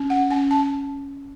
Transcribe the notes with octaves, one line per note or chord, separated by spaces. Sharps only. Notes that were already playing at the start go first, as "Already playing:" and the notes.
Already playing: C#4
F#5
C#4 G#5
A5